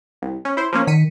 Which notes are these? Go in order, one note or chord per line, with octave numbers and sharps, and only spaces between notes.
C2
C#4
E4 C5
F3 A#3 C#4
D#3 B6 C#7 D#7